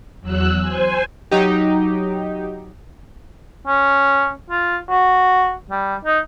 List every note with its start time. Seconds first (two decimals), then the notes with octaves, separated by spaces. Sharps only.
0.21 E2 F#3 E6 F#6
0.61 C5 G#5
1.31 F#3 D#4 G4
3.67 C#4
4.50 F4
4.90 F#4
5.70 G3
6.05 D#4